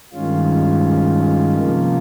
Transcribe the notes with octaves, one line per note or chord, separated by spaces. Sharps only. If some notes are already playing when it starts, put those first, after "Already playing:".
G2 D#3 G#3 C#4 F4
C3 F3 A#3